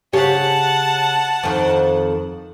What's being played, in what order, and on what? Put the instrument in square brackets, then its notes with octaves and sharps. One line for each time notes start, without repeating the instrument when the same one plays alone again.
[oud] C#3 G4 C#5 [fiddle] F#5 A5
[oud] F2 D#3